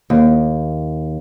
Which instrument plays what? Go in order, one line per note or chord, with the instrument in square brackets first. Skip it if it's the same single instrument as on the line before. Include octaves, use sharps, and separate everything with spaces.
[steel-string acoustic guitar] D#2